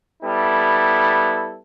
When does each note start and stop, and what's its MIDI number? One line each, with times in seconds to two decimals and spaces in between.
0.23 1.59 55
0.23 1.59 59
0.23 1.59 64
0.23 1.59 69